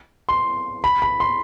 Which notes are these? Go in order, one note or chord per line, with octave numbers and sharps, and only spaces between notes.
C6
B5
B5
C6